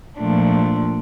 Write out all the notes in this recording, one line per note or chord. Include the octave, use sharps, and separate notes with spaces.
A#2 F3 A3 D4